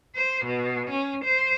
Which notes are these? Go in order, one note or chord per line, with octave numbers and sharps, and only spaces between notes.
C5
B2
C#4
C5